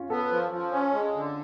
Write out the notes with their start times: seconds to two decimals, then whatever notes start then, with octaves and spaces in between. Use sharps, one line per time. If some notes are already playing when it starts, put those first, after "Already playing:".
Already playing: C#4 F4
0.10 B3 A4
0.31 F3
0.52 F3
0.72 C#4
0.93 G#3
1.14 D3